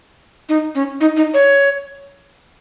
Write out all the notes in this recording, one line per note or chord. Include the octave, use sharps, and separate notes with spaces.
D#4
C#4
D#4
D#4
C#5